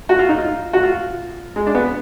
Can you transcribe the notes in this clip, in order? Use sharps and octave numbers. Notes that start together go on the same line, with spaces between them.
F#4
F4
D#4
F4
F#4
F4
G#3
D4
B3